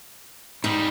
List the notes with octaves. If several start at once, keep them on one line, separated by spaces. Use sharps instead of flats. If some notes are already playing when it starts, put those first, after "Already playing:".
G#2 G3 D#4